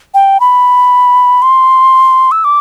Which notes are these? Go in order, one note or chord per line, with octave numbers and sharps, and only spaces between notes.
G5
B5
C6
E6
D6